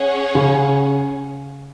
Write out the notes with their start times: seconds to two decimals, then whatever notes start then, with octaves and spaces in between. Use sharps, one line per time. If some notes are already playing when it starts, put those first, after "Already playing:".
Already playing: C#4 G#4 C#5 F#5
0.35 C#3